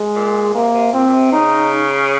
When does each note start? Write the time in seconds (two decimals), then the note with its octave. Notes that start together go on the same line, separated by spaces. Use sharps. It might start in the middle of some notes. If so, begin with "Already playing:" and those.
Already playing: G#3
0.16 A#2
0.55 C3 A#3
0.74 C3
0.93 A#2 C4
1.07 A#2
1.13 C3
1.32 C#3 D#4